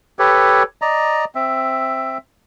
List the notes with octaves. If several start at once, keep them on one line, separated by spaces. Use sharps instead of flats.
G4 A4 B4 C#5
D5 D#5 A#5
C4 E5